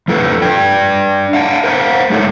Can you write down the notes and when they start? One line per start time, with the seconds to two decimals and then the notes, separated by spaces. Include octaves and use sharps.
0.08 F3 F4 A4 B4
0.42 D4 D5 G5
1.33 F5 F#5 A5
1.64 A#4 C5 D#5 F5 F#5
2.10 G#3 A3 D#4 A4 C#5